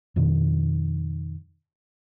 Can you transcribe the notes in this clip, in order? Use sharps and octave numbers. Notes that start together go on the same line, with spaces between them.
F2 B2 D#3